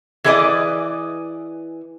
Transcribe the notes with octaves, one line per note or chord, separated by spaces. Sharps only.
E3 G#4 B4 D5 D#5